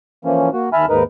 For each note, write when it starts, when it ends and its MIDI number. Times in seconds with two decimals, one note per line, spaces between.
0.25 0.50 52
0.25 0.50 53
0.25 0.50 58
0.25 0.50 61
0.53 0.69 58
0.53 0.69 66
0.73 0.86 39
0.73 0.86 76
0.73 0.86 80
0.73 0.86 81
0.73 0.86 83
0.73 0.86 89
0.89 1.03 39
0.89 1.03 44
0.89 1.03 63
0.89 1.03 70
0.89 1.03 71